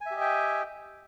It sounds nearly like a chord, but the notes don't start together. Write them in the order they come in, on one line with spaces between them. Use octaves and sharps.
G#5 E5 G4 D#5 G5